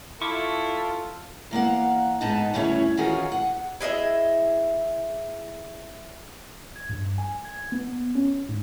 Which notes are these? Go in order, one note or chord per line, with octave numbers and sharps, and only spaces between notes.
E4 F4 A4 C#6 D6
E2 A#3 F5 F#5
G#2 B3 D#4 B4 A5
D2 G2 C#3 C#4 E4 C#5
D#3 E3 C#4 F4 F#4 G#4
F#5
E4 G#4 D#5 E5
G#6
G2
G#5
G#6
B3
C#4
G#2